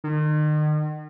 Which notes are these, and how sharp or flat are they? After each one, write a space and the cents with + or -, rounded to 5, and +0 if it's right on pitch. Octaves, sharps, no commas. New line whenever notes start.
D#3 -40